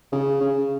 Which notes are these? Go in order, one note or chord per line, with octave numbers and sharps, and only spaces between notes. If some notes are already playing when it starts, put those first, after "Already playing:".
C#3
C#3